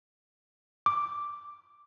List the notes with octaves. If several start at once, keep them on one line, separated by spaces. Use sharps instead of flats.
D6